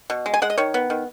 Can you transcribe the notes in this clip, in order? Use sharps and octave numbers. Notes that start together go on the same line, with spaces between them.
B2
G#3
G#5
G#3 F#5
D#5
D#3 C#5
B3
D#3